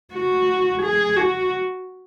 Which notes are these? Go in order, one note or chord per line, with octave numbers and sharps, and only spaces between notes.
F#4
G#4
F#4